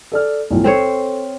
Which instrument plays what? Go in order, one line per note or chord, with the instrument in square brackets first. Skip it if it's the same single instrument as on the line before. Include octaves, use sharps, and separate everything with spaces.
[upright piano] A4 D5 F6
B1 A2 F3
[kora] C4 C5 C#5 [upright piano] A4